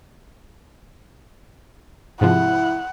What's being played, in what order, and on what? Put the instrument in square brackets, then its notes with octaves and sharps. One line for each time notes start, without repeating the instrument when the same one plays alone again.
[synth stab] G#2 C3 F3 [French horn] E4 [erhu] F#5